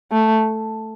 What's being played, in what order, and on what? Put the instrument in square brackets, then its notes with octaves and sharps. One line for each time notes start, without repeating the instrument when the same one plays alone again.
[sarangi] A3